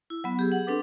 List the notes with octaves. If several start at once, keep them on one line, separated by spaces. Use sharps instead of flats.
E4
F#3 B3
G4 G#4
F#5
C4 D4 A4 B4 D6